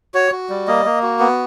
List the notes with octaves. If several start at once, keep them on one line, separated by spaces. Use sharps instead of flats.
F#4 C#5
F#4
G3
A#3 D#5
A#3
F#4
B3